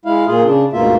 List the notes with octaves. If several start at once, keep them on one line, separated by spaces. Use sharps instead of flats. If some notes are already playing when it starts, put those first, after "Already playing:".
G#3 E4 F5
A#2 F4 G#4
C#3 D4
D2 G#2 B2 A#3 F4 E5